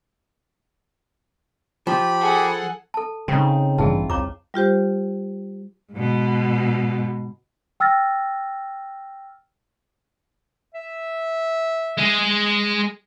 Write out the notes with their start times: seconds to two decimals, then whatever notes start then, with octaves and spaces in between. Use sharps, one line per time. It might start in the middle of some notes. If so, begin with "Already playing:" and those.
1.87 F3 G4 B5
2.21 G#4 A4 F#5
2.94 A4 A5
3.28 C#3 C4 D#4
3.78 A1 G2 E3 F4 G#4 A5
4.10 C2 F2 C#5 A#5 D6
4.54 G3 F4 G4 C5
5.92 G#2 B2
7.80 G5 E6 F6 A6 A#6
10.75 E5
11.97 G#3 G#4